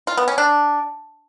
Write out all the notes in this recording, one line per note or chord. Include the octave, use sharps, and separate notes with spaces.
F4
B3
C#4
D4